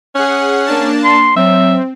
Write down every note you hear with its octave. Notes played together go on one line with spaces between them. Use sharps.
C#4 G#4 F#5
A#3 D4 A5
C6
F#3 C4 E5